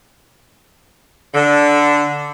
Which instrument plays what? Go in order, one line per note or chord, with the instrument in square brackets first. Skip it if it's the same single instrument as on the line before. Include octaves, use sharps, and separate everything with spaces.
[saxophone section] D3